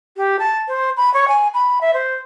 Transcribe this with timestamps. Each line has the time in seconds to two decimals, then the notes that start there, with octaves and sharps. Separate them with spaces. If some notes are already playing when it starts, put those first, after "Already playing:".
0.16 G4
0.39 A5
0.68 C5
0.97 B5
1.13 C#5
1.28 G#5
1.54 B5
1.81 E5
1.93 C5